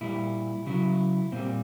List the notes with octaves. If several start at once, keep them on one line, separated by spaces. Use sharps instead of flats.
A#2 G3 E4
C#3 F#3 E4
A#2 G3 C4